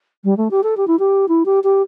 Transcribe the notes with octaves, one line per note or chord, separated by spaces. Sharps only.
G3
A3
G4
A4
G4
E4
G4
E4
G4
G4